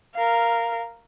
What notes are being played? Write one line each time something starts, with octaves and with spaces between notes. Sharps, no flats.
A#4 F5